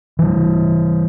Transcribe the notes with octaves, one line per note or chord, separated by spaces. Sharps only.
E3 G3